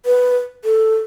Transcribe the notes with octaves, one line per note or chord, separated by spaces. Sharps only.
B4
A4